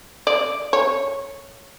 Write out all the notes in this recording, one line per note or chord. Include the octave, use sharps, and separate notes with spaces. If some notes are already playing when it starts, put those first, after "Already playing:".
D5
C#5